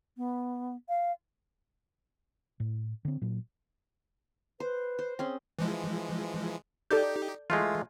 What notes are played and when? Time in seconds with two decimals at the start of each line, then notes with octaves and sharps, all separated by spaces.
0.17 B3
0.89 F5
2.60 A2
3.05 D3 C4
3.22 A#2 F#3
4.60 B4 C5
4.99 C5
5.19 C4 C#4 G#4 C6
5.59 E3 F3 G#3
6.91 D#4 G4 A4 D5 G6
7.50 E3 G#3 A3 F4